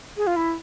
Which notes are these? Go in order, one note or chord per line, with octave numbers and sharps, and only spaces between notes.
G#4
F4
E4